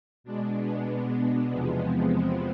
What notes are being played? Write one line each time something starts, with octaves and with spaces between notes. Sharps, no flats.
B2 G#3 D4
B3
E2 C3 F3 G#3 B3
C4